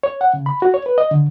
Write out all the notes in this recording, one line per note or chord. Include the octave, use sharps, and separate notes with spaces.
C#5
F#5
C#3
B5
F#4
C#5
B4
D#5
D3